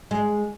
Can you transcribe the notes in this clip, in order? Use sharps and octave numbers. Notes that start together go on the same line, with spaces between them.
G#3